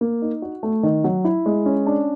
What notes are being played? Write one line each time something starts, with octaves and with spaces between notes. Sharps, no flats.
A#3
D#4
F#4
A3
D#3
F#3
E4
G#3
C#4
D4